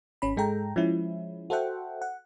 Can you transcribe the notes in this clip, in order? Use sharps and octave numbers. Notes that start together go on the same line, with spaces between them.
G#1 C#4 B5
G#2 G#3 A4 G5 A#5
F3 G#3 C#4 E4
F#4 A4 C5 E5 F#5 G5
F#5